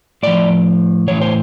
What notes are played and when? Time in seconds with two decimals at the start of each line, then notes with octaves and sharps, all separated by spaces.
0.23 A2 F3 D5
1.07 A2 E3 C#5
1.21 C5